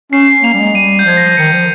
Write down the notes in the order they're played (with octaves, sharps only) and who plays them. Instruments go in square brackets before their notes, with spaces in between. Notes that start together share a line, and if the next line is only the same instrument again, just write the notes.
[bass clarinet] C#4 [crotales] C7
[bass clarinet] A#3 [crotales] F7
[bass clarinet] G3
G#3
[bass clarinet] G3 [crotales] D#7
[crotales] G6
[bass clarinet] F3 [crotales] G#6
[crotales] A#6
C7
[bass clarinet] D#3 [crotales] C#7
[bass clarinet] F3